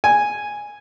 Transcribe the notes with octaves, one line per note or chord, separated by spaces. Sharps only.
G#5